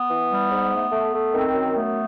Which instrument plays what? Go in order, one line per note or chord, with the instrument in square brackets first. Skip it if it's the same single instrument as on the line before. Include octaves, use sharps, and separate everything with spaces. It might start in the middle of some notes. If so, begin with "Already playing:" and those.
Already playing: [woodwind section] B3
E3
G3
G#2
A3
A3
A3
D#3 C4
F#2
A3 B3